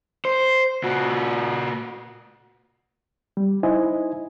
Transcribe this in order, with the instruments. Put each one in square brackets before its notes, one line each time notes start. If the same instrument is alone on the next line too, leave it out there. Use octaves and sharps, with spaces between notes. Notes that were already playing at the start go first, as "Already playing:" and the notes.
[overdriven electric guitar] C5
A#2 F#4
[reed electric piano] G3
D#4 E4 C5 D#5 G#5